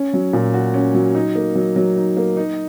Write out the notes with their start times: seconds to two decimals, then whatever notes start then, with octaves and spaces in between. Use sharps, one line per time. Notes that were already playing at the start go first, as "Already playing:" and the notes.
Already playing: C#4
0.13 F#3
0.33 A#2
0.54 F#4
0.74 C#4
0.94 F#3
1.15 D#4
1.35 A#3
1.55 F#3
1.76 F#3
1.96 D#4
2.17 A#3
2.37 D#4